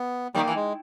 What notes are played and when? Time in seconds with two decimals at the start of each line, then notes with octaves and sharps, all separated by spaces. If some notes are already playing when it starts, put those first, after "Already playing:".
Already playing: B3
0.35 D#3 G3 A#3
0.47 E3
0.55 G#3